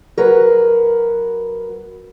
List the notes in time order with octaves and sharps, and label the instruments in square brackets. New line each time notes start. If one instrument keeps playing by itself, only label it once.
[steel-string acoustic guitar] F#3 A#4 B4